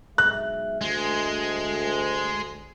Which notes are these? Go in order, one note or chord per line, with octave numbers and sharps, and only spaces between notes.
B1 G#3 E5 F#6
D2 G#3